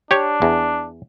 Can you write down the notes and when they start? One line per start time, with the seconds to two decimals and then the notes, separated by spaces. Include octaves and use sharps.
0.11 D4 G4 C#5
0.42 E2